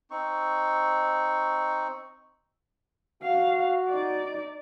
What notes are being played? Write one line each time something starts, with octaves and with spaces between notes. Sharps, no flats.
C4 D#4 C#6
F#4 F5
D#4 D5